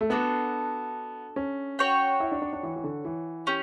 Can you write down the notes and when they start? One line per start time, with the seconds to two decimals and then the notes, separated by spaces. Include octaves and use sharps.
0.01 A3
0.10 B3 D4 F#4 A4
1.36 C#4
1.79 F#4 C#5 G5
2.20 E4
2.32 D4
2.42 D4
2.53 D4
2.63 E3
2.76 E3
2.84 D3
3.05 E3
3.47 C#4 G4